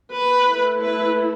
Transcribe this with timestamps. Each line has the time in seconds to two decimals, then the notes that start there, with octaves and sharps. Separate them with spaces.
0.14 B4
0.47 A3 E4
0.81 B4